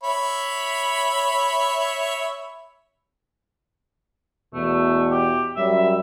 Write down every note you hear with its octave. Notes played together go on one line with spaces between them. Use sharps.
C#5 E5 B5
E2 B2 A3
G4
F#2 G3 E5